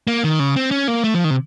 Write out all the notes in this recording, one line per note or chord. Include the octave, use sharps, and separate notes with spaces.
A#3
D#3
C#3
C4
C#4
A#3
A3
F3
D#3
C3